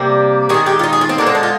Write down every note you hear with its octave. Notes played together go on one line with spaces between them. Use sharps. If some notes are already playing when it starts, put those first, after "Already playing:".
Already playing: C3 G3 A#3
D#3 G#3 G#4
G4
F4
D#4
G#4
F4
C4
D3 G#3 A#3
C4
D4
F4